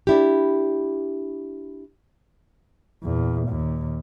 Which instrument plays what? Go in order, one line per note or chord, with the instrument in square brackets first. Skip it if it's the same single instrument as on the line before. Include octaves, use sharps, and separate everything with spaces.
[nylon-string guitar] D4 E4 G4
[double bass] E2 A#2
D#2 A#2